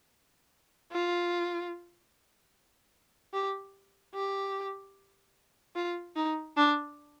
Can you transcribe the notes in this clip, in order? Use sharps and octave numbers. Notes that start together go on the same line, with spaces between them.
F4
G4
G4
F4
D#4
D4